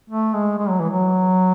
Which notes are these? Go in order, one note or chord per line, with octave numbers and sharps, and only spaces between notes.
A3
G#3
G#3
F#3
E3
F#3